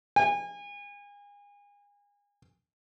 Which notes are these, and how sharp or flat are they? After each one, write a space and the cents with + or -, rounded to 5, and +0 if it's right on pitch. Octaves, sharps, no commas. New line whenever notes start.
G#5 -35